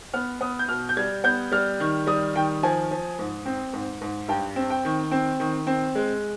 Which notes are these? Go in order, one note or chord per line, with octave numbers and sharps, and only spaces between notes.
B3 F6
B3 D#6
G6
B2 F6
G6
G3 G#6
B3 G6
G3 F6
D#3
G3 D#6
D#3 G5
F3 G#5
F3
G#2
C4
G#2
G#2
G2 G5
C4
G5
D#3
C4
D#3
C4
G#3